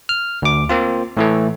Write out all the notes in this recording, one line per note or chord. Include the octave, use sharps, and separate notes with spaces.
F6
D2 D6
A#3 C4 F4
A2 E3 A3